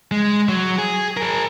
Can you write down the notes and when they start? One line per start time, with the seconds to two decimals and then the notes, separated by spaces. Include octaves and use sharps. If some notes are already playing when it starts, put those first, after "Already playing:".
0.11 G#3
0.48 F#3
0.78 G#4
1.17 G#4 A#4